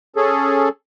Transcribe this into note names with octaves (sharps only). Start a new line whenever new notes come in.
C#4 G#4 A4